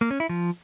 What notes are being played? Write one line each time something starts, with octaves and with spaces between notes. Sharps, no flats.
A#3
C#4
E4
F3